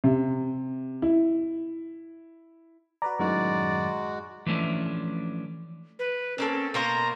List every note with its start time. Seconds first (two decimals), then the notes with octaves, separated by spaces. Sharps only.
0.04 C3
1.02 E4
3.02 F#4 B4 D5 A#5
3.19 F#2 A2 D#3 G#3 F#4 D5
4.46 E3 F3 A3 C#4 D4
5.99 B4
6.38 A#3 C4 C#4 A4
6.74 B2 A#3 C5 A#5